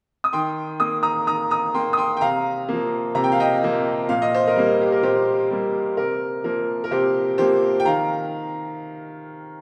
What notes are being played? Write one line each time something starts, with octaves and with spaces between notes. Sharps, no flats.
D#6
D#3 G5 C6
A#3 D#6
A#5 D#6
D#3 A#5 D#6
A#5 D#6
A#3 G5 C6
D#6
G5 C6
G5
C3 F5 A#5
F3 A#3
C3 A#5
G5
F5
D#5 G5
F3 A#3
A#2 F5
D#5
C5
A#4 D#5
G3 A#3
G4
A#4
A#2 G4 C5
G3 A#3
C3 A#4
F3 A#3 A#4
A#4
C3 G4 C5
F3 A#3 G4 C5
G5
D#3 F5 A#5